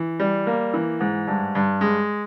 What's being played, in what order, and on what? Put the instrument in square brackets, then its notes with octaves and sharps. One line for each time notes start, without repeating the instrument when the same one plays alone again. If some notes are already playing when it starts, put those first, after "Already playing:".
Already playing: [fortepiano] E3
G3
A#3
E3
G#2
G2
G2
G#3